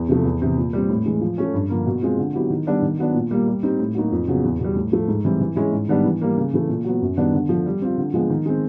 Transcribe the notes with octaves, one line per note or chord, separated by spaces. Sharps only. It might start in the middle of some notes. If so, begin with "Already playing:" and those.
Already playing: E2
C3 F3 A3
E2
C3 E3
A#2
G3 C4
A2
E3 G#3
F3
A3 C#4
G2
D3 F3 A#3
B2
G#3 C4 F4
D3
F#3 B3 E4 G4
D#3
G3 B3 D4
D#3
F#3 B3 D4
A#2
G3 A#3
G3
C4 D#4 G4
A2
F#3 A#3 D#4 F#4
F2
C#3 F#3 B3
E2
B2 G3
A2
F3 A3
G#2
E3 G3 C4 E4
E3
G#3 C#4 E4
G#2
D#3 G3 B3 D4
E3
G3 A#3
C#3
E3 A3
A#2
F#3 B3
F#2
D#3 G3 B3 D4
D3
F3 A3
G3
C4 F4
D3
F3 G#3 B3
D#3
G#3 C4